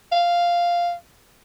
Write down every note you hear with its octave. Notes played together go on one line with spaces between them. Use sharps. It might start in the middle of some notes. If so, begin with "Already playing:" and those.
F5